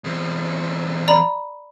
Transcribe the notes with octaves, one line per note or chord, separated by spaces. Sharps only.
E2 C4
D5 A#5 B5